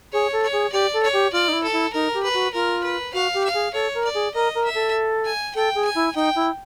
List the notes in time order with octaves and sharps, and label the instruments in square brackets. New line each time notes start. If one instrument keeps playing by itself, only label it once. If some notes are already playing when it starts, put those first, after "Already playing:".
[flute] G#4 [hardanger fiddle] C#5
[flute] A4
[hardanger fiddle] C#5
[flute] G#4
[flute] G4 [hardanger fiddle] D5
[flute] A4
[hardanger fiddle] C#5
[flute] G4
[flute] F4 [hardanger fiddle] D5
[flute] D#4
E4
[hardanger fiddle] A4
[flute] E4
[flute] D#4 [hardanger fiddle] A#4
[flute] G4
[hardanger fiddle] B4
[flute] F#4
[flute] F4 [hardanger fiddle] A#4
[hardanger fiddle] B4
[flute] F#4 [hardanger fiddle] F5
[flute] G4
[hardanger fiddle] F5
[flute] G#4
[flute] A4 [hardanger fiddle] C#5
[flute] A#4
[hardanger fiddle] D5
[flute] G#4
[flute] A#4 [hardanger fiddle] D#5
[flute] A#4
[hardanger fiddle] E5
[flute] A4
[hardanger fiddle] G#5
[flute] A4 [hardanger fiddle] G5
[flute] G#4
[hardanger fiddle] G#5
[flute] E4
[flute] D#4 [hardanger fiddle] G5
[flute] E4